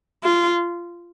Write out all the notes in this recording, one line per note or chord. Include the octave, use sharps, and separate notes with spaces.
F4